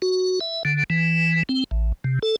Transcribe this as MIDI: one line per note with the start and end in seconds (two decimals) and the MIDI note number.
0.02 0.39 66
0.41 0.63 76
0.65 0.84 50
0.90 1.43 52
1.49 1.64 60
1.71 1.92 33
2.04 2.19 48
2.23 2.36 69